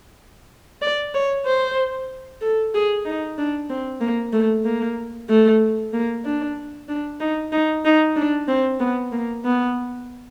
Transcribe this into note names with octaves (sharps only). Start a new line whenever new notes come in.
D5
C#5
C5
A4
G#4
D#4
D4
C4
A#3
A3
A#3
A3
A#3
D4
D4
D#4
D#4
D#4
D4
C4
B3
A#3
B3